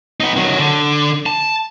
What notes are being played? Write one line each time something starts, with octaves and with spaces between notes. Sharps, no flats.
B3 D#4
D#3 F#3
D3
A5